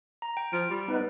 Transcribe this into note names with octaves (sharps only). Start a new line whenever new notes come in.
A#5
G5
F3 D7
G3
B3 D#4 B4